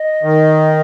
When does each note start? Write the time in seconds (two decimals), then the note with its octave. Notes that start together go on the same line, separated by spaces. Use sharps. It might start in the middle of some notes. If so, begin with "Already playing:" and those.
Already playing: D#5
0.23 D#3